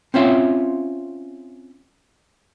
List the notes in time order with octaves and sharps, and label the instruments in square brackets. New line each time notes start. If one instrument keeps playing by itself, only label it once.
[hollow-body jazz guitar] C4 C#4 F4 E5